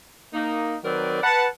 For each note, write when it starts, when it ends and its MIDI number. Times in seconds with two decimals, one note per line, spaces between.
0.33 0.75 58
0.33 0.75 63
0.84 1.19 51
0.84 1.19 54
0.84 1.19 60
0.84 1.19 70
0.84 1.19 71
0.84 1.19 74
1.22 1.47 71
1.22 1.47 78
1.22 1.47 81